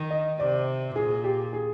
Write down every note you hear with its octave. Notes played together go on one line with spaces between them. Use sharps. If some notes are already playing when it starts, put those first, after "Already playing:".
Already playing: D#3
D#5
C3 D5
A#2 G#4
G4
G#4